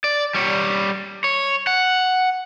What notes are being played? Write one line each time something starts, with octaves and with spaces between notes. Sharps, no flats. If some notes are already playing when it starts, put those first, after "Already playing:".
D5
G3 C#5
C#5
F#5